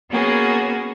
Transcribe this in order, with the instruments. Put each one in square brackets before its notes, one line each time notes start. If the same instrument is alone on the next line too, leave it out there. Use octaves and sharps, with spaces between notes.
[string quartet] A#3 B3 C#4 F#4 G#4